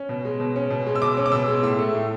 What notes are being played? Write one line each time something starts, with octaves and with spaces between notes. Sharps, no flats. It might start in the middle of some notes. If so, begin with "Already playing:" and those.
Already playing: C#4
B2
G#3
B2
C#4
B2
G#3
E6
B2 D6
C#4
D6
B2 E6
G#3
A2 E6
A3
A2